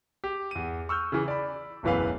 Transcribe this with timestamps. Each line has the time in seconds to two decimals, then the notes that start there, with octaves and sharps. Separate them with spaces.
0.24 G4
0.51 E2 D#7
0.89 C#6 E6 F6 G6
1.12 C#3 E3
1.28 D5 B5
1.83 E1 A1 F#2 E3 B4 F5